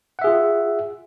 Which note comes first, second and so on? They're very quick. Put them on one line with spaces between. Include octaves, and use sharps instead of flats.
F#5 E5 G#4 F4